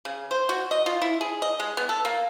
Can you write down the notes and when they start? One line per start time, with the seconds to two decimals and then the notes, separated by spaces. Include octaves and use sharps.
0.05 C#3
0.31 C5
0.49 F#4
0.71 D#5
0.86 F4
1.02 E4
1.21 G#4
1.42 D#5
1.60 G#3
1.77 B3
1.89 A4
2.05 A#3